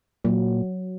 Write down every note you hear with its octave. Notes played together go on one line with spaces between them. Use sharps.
A#2 F#3